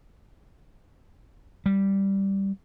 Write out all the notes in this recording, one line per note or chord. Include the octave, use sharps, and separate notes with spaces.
G3